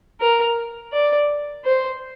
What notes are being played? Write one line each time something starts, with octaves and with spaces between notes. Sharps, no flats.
A#4
D5
C5